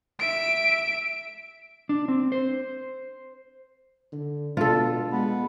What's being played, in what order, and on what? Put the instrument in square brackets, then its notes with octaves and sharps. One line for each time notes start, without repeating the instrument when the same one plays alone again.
[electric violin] E5 D7
[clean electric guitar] D4
C4
C5
[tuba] D3
[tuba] B2 [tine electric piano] D4 [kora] F4 A4
[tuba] G#3 [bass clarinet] B3